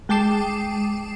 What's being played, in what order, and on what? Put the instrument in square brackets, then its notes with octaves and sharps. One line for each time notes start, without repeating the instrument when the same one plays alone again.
[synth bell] G#3 G5 A5 D6 C7 E7